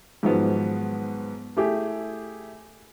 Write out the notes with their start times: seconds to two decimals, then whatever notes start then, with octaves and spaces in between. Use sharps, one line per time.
0.23 G#2 D#3 F3 F#3 B3
1.57 A3 E4 G4 G#4